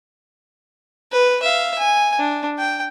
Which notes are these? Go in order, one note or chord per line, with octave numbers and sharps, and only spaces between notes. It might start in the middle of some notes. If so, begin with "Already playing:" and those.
B4
E5 F5
G#5
D4
G5